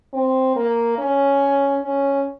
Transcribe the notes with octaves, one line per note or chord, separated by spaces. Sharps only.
C4
A#3
C#4
C#4